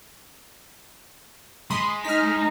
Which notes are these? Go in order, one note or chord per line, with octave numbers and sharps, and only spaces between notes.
G#3 B5 C6 D#6
D#4 F6 B6